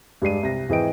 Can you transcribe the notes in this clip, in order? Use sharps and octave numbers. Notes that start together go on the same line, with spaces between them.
G2 G#3 D5 C7 D#7
C2 A#6
G#1 E3 G#4 D#5 G5 D7